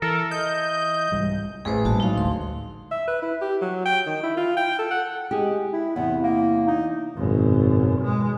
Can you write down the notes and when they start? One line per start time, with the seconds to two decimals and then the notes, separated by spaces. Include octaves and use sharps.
0.02 E3 A4 A#4
0.31 D#5 G6
1.12 C2 G#2 G3
1.65 A1 G#4 B4 C5
1.85 G#1 A#2 G3 F#4 A5
2.00 F#3 G#3 D#4 F5
2.18 D2 C6
2.91 E5
3.07 B4
3.22 E4
3.41 G4
3.61 F#3
3.85 G5
4.06 D#3
4.23 E4
4.37 F4
4.57 G5
4.79 A4
4.91 F#5
5.31 G#3 G4 G#4
5.73 E4
5.96 E2 C3 B3
6.23 A#3
6.67 D#4
7.17 G#1 F#2 B2
8.01 B2 G#3